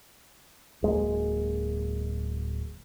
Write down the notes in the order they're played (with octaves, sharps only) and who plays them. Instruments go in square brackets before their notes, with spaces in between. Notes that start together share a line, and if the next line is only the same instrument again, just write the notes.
[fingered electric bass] D1 G#3 A#3